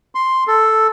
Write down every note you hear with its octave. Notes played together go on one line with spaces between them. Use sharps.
C6
A4